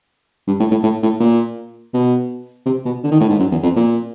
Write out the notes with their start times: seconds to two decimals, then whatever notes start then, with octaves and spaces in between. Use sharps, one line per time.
0.48 G2
0.60 A2
0.71 A2
0.83 A2
1.03 A2
1.20 A#2
1.94 B2
2.66 C3
2.85 B2
3.03 D3
3.12 D#3
3.21 A2
3.30 G#2
3.39 F#2
3.52 E2
3.63 F2
3.76 A#2